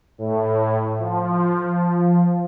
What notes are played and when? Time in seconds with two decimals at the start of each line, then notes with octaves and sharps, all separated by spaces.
0.18 A2
0.98 F3